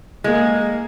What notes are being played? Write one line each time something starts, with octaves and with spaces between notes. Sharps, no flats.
G#3 A#3